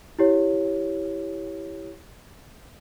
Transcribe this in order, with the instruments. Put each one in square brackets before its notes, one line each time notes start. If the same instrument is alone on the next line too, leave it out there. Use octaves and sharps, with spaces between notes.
[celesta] E4 G4 C#5